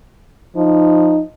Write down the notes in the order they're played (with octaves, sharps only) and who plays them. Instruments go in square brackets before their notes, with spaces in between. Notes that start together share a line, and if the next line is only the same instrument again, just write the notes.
[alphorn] F3 [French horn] D#4